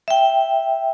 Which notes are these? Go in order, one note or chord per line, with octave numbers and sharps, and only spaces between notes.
E5 G5